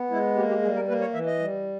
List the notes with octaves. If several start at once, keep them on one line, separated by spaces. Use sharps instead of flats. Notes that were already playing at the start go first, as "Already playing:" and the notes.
Already playing: B3
G#3 E4
A#3 G4
G4
G3 G#4
A#4
A#3 B4
C#5
E3 E5
D#5
G3